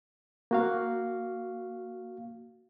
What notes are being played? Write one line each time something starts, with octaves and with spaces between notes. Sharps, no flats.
A#3 F#4 F5